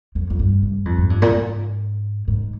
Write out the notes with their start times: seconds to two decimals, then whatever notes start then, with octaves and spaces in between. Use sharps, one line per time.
0.15 F2
0.30 F2
0.39 G2
0.63 G2
0.85 F2
0.98 G#2
1.10 G2
1.22 A#2
1.33 G#2
2.28 G#2